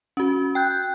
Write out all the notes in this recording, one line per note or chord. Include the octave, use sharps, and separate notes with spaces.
C#4 F#4
G5 F#6 G6